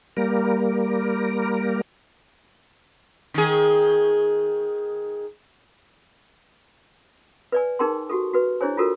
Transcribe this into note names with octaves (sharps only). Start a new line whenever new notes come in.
G3 A#3 A#4
D#3 G#4
B4 D5 G#5
D#4 G#4 A#4 G5 A5 C6
F#4 G4 A4
F#4 B4
D4 E4 G#4 C5 C#5 G#5
F4 F#4 A4 A#4